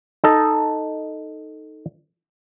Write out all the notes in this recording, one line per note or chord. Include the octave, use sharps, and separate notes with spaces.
D#4 A4 D#5